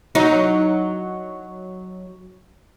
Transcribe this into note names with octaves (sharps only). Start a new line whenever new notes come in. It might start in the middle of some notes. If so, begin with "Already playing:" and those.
F#3 D#4